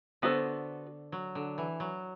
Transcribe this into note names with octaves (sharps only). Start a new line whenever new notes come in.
D3 B3 F#4 A4 C5
F#3
D3
E3
F#3